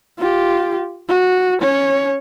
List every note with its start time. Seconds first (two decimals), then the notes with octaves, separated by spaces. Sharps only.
0.19 F4 G4
1.09 F#4
1.61 C#4 C#5